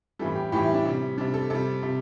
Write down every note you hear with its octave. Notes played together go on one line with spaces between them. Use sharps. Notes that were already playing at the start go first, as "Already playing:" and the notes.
A2 E3 G3 A4
G4
A2 E3 G3 G4
E4
D4
C3 G3
C3 G3 D4
A4
C3 G3 A4
C3